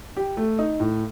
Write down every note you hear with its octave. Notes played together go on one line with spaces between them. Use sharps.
G4
A3
D#4
A2